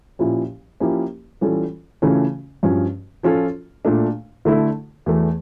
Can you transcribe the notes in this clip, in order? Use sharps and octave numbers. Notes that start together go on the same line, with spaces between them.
A#2 F3 C#4 E4 G4
F3 A#3 C#4 E4 G4
E3 G3 C#4 F4 A4
C#3 E3 A3 C#4 F4
G2 F3 C#4
F3 C#4 F4 A4
A#2 A3 D4
D3 A3 E4 A4
E2 E3 A3